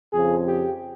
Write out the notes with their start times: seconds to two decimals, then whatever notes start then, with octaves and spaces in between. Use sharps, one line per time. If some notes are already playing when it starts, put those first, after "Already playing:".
0.13 F2 C#3 F3 G#4
0.47 G4